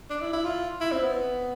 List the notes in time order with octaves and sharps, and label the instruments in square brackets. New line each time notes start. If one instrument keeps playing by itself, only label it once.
[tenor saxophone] D4
E4
E4
F4
E4
C4
B3